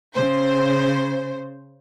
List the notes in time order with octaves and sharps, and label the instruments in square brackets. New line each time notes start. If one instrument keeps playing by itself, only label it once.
[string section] C#3 C5